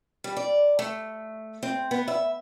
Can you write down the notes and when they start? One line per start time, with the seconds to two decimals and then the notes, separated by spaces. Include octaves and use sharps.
0.24 G3
0.37 D5
0.79 A3
1.63 C4
1.91 B3
2.08 E5